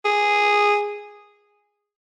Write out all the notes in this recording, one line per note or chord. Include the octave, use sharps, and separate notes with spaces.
G#4